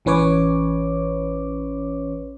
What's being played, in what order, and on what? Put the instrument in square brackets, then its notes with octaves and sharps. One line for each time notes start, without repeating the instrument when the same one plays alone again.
[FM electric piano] A1 E3 C#4 B4 C#5 D6